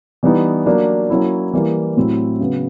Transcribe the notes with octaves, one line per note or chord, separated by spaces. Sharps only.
E3 G3 B3 D#4
F#3 A#3 D4
F#3 A#3 C#4 E4
E3 G3 A#3
A2 F#3 A3 C4 E4
C#3 F#3 B3